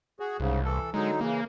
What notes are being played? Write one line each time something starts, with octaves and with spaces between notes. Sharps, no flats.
F#4 G#4
C2 G#2 C#3
E3 A4
D3 F#3 G#3 D#4
C#3 E3 A#3